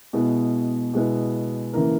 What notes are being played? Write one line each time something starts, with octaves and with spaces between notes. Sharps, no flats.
B2 G#3 B3 E4
B2 G#3 B3 E4
C#3 E3 A#3 E4 A#4